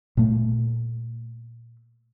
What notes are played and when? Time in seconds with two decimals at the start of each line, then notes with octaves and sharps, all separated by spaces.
0.17 A#2 A3